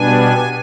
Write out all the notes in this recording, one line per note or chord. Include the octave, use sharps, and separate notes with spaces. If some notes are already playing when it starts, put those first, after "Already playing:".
Already playing: B2 G3 B3 D4 G#5